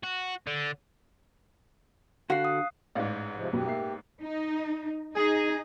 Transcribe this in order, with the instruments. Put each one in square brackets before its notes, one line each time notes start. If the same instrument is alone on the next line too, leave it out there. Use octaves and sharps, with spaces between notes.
[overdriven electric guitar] F#4
D3
[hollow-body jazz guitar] D3 F#4 [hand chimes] F5 F#6 C7
[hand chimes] D#6
[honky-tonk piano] A1 G#2 [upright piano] D5 D#5 F5
[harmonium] C3 F3 G#3
[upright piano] F#2 B2 B3 [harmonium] G4
[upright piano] A#3 E5 C7
[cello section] D#4
[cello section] D#4 [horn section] G#4